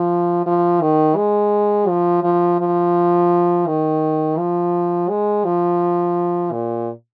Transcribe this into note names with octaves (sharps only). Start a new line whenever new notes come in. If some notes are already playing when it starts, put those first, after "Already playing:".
Already playing: F3
F3
D#3
G#3
F3
F3
F3
D#3
F3
G#3
F3
A#2